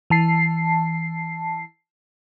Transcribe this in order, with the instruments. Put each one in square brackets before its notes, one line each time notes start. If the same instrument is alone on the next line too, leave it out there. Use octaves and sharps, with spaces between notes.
[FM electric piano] E3 A5 C7